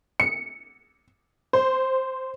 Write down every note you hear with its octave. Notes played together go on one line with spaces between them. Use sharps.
C#7
C5